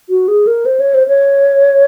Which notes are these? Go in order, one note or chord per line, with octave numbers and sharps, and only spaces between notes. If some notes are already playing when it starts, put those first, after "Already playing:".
F#4
G#4
A#4
C5
C#5
C5
C#5